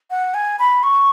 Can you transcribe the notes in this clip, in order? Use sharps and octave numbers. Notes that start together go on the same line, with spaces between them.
F#5
G#5
B5
C#6